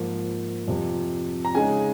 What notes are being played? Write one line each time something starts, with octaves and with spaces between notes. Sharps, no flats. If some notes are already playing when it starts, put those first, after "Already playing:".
Already playing: G#2 F3 A#3
F2 C3 F3
A#5
C#3 G#3 D#4 G#5